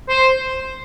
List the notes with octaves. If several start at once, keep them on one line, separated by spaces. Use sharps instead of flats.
C5